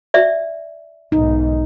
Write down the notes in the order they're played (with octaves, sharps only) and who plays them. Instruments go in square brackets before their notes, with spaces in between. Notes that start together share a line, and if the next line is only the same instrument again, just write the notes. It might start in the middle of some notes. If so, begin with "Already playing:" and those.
[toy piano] D5 E5
[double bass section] B1 G#2 [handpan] D#4